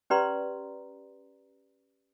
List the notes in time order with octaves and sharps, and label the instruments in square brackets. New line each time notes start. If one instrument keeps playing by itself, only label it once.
[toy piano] C#4 G4 B4 D5 A#5 C6